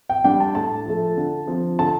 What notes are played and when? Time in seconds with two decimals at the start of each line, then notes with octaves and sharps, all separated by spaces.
0.09 G5
0.24 G3 D4 G5
0.40 A5
0.55 A2 A5
0.86 F3 A3
1.17 D3
1.47 F3 C4
1.79 D3 A5